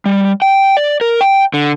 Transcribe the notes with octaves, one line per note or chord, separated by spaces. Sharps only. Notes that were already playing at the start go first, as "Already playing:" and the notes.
G3
G5
D5
A#4
G5
D3